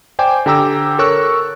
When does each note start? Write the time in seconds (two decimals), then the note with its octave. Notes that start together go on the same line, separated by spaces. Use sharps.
0.19 C5 D5 G5 G#5 D6
0.46 D3 G4 G5 A#5 D6 E6
0.98 A4 A#4 C#5 C#6 E6 F#6